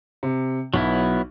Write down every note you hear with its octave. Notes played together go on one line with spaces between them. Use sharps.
C3
B1 F#3 B3 E4